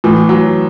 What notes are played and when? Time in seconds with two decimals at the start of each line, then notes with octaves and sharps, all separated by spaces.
0.04 A2 E3
0.29 F#3